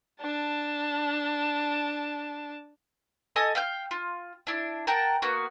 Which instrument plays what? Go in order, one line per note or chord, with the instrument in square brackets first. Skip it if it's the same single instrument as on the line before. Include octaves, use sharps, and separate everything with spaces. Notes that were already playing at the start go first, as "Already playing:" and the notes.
[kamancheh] D4 A5
[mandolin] A4 D#5 G#5
F5 G5 F6 G6
F4
D4 E4
A#4 F#5 G5 A5
A#3 B3 F#4